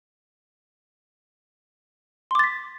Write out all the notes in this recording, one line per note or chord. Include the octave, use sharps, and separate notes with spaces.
C6 D6 A6 B6